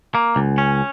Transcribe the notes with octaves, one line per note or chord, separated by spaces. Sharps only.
A#3
C#2
C#4